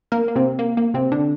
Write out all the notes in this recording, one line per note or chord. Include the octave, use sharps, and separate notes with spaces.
A#3 A#4
A#3
C3 C4
A#3
A#3
C3 C4
D3 D4